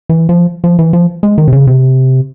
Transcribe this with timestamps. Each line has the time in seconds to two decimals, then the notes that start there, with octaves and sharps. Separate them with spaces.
0.09 E3
0.29 F3
0.64 F3
0.79 E3
0.93 F3
1.23 G#3
1.38 D#3
1.48 C3
1.53 C#3
1.67 C3